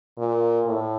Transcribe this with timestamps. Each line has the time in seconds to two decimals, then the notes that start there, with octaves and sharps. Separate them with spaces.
0.18 A#2
0.67 A2